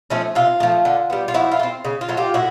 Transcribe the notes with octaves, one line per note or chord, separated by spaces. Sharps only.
F3 A3 C#4
C3 F4
F3 A3
D3
G3 B3
F4
F3 E4 F#4
F4
A3
C4
C#3
F4
F#3 A3
F4 G4
A2 E4 F#4